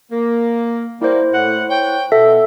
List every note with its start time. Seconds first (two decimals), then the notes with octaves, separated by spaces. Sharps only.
0.12 A#3
1.02 G3 A#3 E4 C5
1.33 A2 F#5
1.69 C#5 G5
2.12 B2 A4 E5 F#5